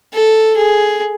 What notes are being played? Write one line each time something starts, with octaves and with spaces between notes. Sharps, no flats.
A4
G#4